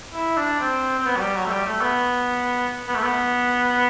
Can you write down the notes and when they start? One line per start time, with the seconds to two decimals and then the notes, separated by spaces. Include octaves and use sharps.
0.14 E4
0.37 D4
0.60 C4
0.98 C4
1.06 B3
1.17 F#3
1.21 G3
1.36 F#3
1.46 A3
1.51 G3
1.66 A3
1.81 B3
2.88 B3
2.96 A3
3.03 B3